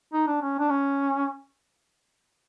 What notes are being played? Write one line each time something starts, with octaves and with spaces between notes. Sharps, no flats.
D#4
D4
C#4
D4
C#4